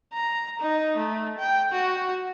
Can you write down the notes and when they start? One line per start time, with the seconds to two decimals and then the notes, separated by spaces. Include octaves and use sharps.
0.13 A#5
0.59 D#4
0.97 A3
1.38 G5
1.72 F#4